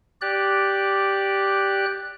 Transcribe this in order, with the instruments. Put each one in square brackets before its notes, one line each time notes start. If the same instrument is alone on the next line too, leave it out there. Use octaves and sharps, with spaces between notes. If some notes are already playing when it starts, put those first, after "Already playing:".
[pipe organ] G4 D5 F#6